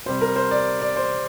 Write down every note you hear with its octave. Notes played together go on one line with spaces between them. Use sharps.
C3 G3 C5
A#4
C5
D5
D5
C5